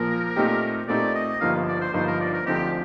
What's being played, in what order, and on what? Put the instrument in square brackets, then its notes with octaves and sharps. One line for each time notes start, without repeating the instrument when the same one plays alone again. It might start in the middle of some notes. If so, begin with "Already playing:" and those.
Already playing: [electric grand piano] A#2 F3 A#3 [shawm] A#4
[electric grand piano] A#2 A3 C4 D#4 G4
[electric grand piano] A#2 A3 C4 D#4 G4 [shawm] D5
[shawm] D#5
[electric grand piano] G1 G2 F3 A#3 D#4 [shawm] F5
[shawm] D5
C5
[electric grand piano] G1 G2 F3 A#3 D#4 [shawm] C5
[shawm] A#4
D5
A#4
[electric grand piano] D2 D3 F3 C4 D#4 [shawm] G4